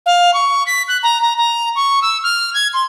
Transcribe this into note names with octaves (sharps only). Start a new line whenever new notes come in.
F5
C#6
B6
F#6
A#5
A#5
A#5
C#6
E6
F6
G#6
C6